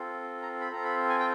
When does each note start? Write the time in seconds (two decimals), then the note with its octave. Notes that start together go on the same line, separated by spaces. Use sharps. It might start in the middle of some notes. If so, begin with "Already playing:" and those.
Already playing: C4 F4 A4
0.42 A#5
0.60 B5
0.70 C4 F4 A4 A#5
0.85 B5
1.09 G#5
1.19 G5